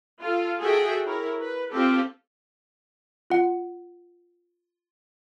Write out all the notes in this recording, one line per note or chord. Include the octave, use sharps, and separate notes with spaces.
F4 A4
F#4 G#4 A4 E5 G5
E4 A#4 C#5
B4
C4 F4 G4 A4
F4 F#5